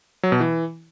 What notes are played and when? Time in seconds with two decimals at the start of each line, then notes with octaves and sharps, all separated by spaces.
0.23 F#3
0.32 B2
0.40 E3